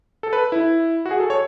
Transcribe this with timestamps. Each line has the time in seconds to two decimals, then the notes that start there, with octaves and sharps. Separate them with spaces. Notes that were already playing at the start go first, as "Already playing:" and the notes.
0.23 A4
0.33 B4
0.52 E4
1.06 F#4
1.11 G#4
1.20 A4
1.30 C#5